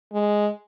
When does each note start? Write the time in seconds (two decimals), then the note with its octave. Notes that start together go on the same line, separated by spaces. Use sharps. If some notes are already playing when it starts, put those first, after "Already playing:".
0.13 G#3